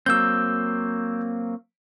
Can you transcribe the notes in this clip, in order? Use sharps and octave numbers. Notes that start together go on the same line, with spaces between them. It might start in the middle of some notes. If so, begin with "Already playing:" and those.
F#3 A#3 C4 E6 G6